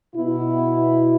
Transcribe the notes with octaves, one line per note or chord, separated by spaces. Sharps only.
B2 B3 E4